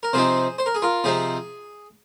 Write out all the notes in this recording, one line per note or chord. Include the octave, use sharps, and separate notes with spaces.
A#4
C3 F3 C4 D#4 G#4 C5
C5
A#4
G#4
F4 A#4
C3 F3 C4 D#4 G#4